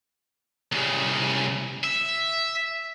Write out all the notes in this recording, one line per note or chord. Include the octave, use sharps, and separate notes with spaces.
C2 C#3
E5